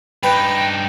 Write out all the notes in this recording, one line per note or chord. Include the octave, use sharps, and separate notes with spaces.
G2 D#4 B4 G5